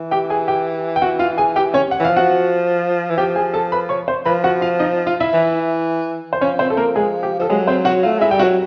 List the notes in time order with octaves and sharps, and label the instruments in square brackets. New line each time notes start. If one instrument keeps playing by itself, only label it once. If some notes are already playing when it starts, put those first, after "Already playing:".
Already playing: [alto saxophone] E3
[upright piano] G4 G5
G#4 G#5
G4 G5
G5
F#4 F#5
F4 F5
G#4 G#5
G4 G5
C#4 C#5
F#5
[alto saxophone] E3
[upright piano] F5
[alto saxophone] F3
[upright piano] F#4 F#5
[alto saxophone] E3
[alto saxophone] F3 [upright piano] G4 G5
[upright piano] G#4 G#5
A4 A5
B4 B5
C#5 C#6
C5 C6
[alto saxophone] F3 [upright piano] B4 B5
[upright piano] F#4 F#5
F4 F5
D#4 D#5
F4 F5
E4 E5
[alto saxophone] E3
[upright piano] C5
[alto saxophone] F3 [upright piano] C#4 C#5
[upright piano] C4 C5
A4
A#3 A#4
G#3 G#4
G4
[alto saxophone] F3 [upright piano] A4
[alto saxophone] F#3 [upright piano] G#3 G#4
[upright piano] C4 C5
F#4 F#5
[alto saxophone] A3 [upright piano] F4 F5
[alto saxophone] G#3 [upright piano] E4 E5
[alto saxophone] G3 [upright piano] G5
[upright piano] F#4 F#5
[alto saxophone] F#3